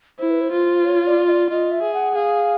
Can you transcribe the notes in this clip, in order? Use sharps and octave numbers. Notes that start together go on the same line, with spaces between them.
E4 C5
B4
C5
F4
C#5
D5
D#5
D5
F4 D#5
E5
G#4
F#5
G#4 F5